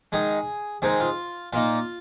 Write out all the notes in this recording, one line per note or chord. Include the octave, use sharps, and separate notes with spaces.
D#3 G#3 D#4 G#4
D#3 G#3 C4 D#4 G#4
F4
A#2 A#3 D#4 F4